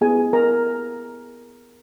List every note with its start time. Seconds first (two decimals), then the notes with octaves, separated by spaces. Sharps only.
0.01 B3 E4 G4 G#4 G#5
0.33 A#4 A#5